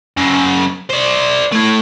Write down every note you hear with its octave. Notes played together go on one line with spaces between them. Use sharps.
F#2 C#3
C5 D5
A3 E4